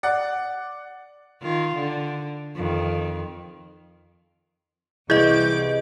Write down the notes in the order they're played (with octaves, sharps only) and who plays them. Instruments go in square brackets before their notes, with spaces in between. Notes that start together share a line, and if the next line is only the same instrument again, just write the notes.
[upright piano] D5 F#5
[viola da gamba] D#3 F4
D3
F2 D#3
[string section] C2 D6 [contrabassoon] E3 [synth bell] G#4 D#5 [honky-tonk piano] G6